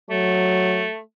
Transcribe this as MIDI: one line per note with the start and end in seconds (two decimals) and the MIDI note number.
0.10 0.87 54
0.10 1.00 57